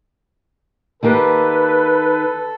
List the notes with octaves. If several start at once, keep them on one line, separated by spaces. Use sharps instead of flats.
D#3 A#3 G4 A4 B4